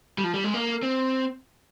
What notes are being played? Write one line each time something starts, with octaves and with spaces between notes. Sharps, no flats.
G3
F3
G3
G#3
A#3
C4